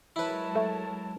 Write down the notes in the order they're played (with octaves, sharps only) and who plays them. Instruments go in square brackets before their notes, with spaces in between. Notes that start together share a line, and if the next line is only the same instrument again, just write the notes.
[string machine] F#3 G#3 A#4 [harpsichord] E4 B4 [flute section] C#5 A5
[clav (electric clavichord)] A3